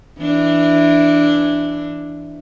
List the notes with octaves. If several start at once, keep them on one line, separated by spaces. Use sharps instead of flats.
E3 D4